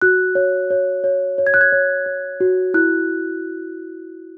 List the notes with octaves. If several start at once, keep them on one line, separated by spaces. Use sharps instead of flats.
F#4 F#6
C#5
C#5
C#5
C#5
G#6
F#6
G#6
C#5
C#5
F#4
E4 F#6